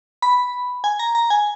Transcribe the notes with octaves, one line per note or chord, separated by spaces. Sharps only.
B5
G#5
A#5
A#5
G#5